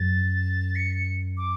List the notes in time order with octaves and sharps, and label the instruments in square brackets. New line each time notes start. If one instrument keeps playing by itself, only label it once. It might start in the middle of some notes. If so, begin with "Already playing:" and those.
Already playing: [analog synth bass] F#2 [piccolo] A6
[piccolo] C#7
D6